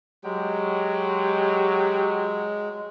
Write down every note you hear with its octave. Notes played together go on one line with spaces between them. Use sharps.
F#3 G#3 G4